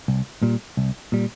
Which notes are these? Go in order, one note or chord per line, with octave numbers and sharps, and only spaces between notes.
C2
A#2 G3
C2
A#2 G3